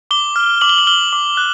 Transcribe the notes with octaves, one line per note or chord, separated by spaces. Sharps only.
D6 G7
F6
D6 F#7
G7
F#7
F6 G7
D6
F#6